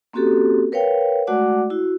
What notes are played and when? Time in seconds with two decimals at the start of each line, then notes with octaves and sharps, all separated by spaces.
0.13 A#3 C4 C#4 F#4 G4 A4
0.72 A#4 B4 C#5 F5 G5
1.27 G#3 A3 F#4 D5 F#5 D6
1.70 E4 F#4